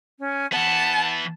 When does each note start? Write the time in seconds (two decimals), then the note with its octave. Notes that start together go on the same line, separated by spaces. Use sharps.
0.19 C#4
0.52 E3 B3 F#5 A5